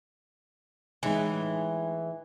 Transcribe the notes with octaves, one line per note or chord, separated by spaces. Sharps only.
A2 E3 G#3 D#4